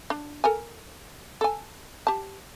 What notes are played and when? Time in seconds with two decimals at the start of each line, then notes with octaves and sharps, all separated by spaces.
0.10 D4
0.44 A4 A#4 G#5
1.41 A4 G#5
2.07 G4 A5